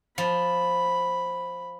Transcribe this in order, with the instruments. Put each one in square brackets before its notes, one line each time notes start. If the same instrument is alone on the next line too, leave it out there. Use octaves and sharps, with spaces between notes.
[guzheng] F3 [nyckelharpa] B5